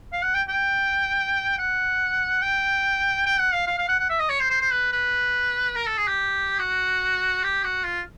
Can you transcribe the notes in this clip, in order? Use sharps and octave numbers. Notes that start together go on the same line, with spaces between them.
F5
F#5
G5
G5
F#5
G5
G5
F#5
F5
F5
F5
F#5
F#5
E5
D#5
C#5
C5
C5
C5
B4
B4
A#4
A4
G#4
G4
F#4
G4
F#4
F4